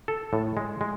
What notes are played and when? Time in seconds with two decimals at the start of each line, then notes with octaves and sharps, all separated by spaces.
0.08 A4
0.33 A2
0.57 G#3
0.81 G#3